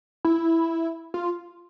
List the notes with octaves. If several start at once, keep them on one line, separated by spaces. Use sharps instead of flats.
E4
F4